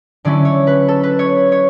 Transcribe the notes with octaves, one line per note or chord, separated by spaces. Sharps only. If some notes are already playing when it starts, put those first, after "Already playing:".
D3 F#3 C#4 E4 D5
C#5
B4
A4
B4
C#5
C#5